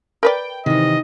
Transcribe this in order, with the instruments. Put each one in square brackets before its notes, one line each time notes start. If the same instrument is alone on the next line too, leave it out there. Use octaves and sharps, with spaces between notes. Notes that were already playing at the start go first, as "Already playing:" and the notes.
[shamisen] A#4 B4 D5 [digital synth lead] G5
[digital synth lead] C3 [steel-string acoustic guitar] D#3 E3 [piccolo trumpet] D#5